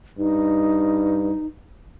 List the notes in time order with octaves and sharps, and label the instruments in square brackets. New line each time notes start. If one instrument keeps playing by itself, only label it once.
[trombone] G2 [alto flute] D#4